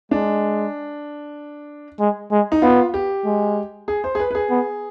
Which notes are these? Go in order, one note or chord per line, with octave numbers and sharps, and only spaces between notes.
G#3 D4
G#3
G#3
D#4
B3 F4
G4
G#3
G#4
C5
G#4
B4
B4
G#4
B3